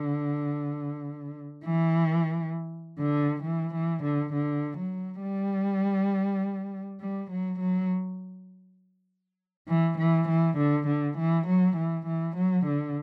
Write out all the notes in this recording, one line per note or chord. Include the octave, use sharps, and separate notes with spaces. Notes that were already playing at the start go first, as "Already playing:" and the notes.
Already playing: D3
E3
D3
E3
E3
D3
D3
F#3
G3
G3
F#3
F#3
E3
E3
E3
D3
D3
E3
F#3
E3
E3
F#3
D3